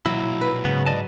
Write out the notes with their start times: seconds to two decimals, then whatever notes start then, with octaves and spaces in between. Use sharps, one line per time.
0.06 B1 A#2 F#3 E4
0.41 B4
0.65 G#2 C#3 B3
0.86 G#2 D5 D#5 A5